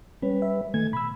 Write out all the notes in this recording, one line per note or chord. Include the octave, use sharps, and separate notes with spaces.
G3 C#4 B4
E5
D#3 A3 G#5 G#6
B2 B5 E6